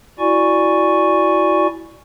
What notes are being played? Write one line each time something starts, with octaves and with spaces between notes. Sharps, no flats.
E4 F#4 D5 G#5 C#6